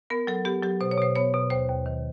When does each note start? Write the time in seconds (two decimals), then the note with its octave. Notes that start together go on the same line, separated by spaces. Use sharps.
0.10 B3 A#4
0.27 F#3 A4
0.45 B3 G4
0.62 F#3 G4
0.81 B2 C5
0.91 C#5
0.98 B2 C5
1.16 B3 C#5
1.34 B2
1.50 D#2 C5
1.69 D#2
1.86 D#3